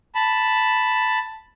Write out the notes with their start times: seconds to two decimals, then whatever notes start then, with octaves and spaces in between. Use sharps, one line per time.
0.15 A5 B5